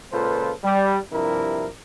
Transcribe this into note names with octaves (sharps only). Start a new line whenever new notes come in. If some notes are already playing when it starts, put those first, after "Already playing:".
C#2 A#2 F4 A4 B4 C5
G3
G2 C3 F3 E4 A#4